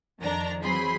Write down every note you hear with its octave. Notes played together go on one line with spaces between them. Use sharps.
F2 D#3 F3 D4 A#5
E3 F#3 C4 G#4 B5 C6